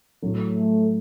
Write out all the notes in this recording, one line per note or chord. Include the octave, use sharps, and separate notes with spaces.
A2 F#3 A3
A3